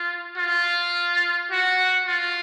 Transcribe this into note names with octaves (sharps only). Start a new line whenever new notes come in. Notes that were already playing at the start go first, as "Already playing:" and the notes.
Already playing: F4
F4
F#4
F4